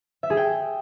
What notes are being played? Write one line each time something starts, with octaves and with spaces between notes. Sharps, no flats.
E5
G#4
G5